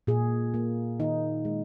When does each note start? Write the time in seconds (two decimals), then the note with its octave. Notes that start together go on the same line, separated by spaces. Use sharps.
0.07 A#2 G#4
0.54 A#3
1.00 D#3 D#4
1.45 G#3